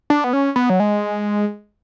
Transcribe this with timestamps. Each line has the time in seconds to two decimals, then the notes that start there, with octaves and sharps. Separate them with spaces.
0.10 D4
0.24 B3
0.33 C#4
0.56 B3
0.70 F#3
0.80 G#3